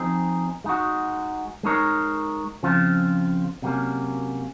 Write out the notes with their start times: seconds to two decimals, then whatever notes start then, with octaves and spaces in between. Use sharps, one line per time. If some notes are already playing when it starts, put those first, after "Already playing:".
Already playing: F3 C4 D#4 G#4
0.64 G#3 D#4 F#4
1.63 G#3 D#4 A#4 C#5
2.63 C#3 F3 C4 F4
3.62 C3 F#3 A#3 C#4